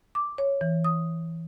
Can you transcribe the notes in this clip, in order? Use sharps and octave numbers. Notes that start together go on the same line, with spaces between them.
D6
C#5
E3
D#6